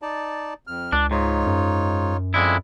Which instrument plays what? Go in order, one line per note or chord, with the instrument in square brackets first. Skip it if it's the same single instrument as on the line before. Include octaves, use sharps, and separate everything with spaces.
[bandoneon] D#4 D5 A5
F2 F6
[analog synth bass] C#2 [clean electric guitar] D4
[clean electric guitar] G#2 [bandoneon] D#4 F4 C#5
[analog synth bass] F#2
[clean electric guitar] F2 G#3 E4 [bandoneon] D5